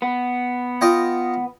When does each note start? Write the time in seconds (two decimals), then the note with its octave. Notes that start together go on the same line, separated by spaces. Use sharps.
0.02 B3
0.81 F4 D#5 G5